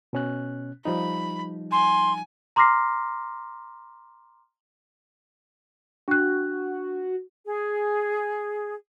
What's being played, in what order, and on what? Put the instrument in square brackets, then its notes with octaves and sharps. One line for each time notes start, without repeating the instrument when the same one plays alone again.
[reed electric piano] B2 C#4 F#6
[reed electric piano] F3 G3 D#4 [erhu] B5
[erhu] G#5 [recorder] C6
[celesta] A#5 C6 D6 F6 A#6 C7
[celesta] D4 F#6 [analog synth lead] F#4
[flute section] G#4